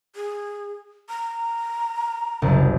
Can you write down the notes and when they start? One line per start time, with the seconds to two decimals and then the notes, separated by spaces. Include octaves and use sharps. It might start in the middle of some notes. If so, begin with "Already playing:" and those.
0.16 G#4
1.09 A#5
2.42 F#1 C2